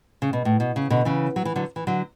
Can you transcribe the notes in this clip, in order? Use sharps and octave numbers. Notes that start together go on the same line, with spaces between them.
C#3
B2
A2
B2
C#3
B2 D3
C#3 E3
F#3
E3
D3 F#3
E3
D3 F#3